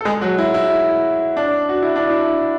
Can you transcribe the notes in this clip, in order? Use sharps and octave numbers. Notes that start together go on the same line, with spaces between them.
A4
G#3 G#4
F#3 F#4
E4
E4
D4
F#4
E4
D4
E4